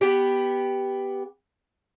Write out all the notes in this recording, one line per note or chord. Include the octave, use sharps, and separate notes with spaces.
B3 G4